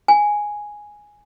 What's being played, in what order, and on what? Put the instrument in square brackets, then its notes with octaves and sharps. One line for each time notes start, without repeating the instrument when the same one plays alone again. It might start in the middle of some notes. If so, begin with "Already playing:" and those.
[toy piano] G#5